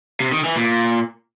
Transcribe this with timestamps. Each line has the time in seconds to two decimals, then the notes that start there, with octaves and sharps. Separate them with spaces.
0.20 C3
0.32 D#3
0.44 E3
0.56 A#2